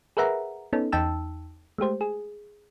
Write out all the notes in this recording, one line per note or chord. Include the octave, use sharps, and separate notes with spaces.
G#4 A#4 B4 E5 F#5 A#5
B3 C#4 D#4 A4
E2 D#4 G5 A5 E6
G#3 A3 G4 C5
G#4